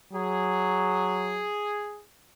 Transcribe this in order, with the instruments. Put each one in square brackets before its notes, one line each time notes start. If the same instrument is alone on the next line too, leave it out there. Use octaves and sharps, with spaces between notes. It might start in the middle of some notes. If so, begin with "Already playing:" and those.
[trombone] F#3 [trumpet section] G#4